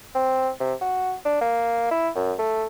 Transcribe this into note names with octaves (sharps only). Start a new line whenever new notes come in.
C4
C3
F#4
D4
A#3
E4
F#2
A3